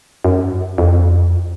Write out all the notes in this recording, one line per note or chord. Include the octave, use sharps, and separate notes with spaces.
F#2
F2